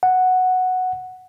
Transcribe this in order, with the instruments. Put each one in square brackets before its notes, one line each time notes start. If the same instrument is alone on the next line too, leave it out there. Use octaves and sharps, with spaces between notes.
[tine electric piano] F#5